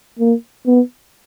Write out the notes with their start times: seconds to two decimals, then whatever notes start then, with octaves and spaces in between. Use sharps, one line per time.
0.19 A#3
0.66 B3